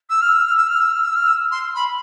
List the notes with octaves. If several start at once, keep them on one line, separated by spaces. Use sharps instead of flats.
E6
F6
E6
F6
E6
F6
E6
F6
E6
F6
E6
C6
B5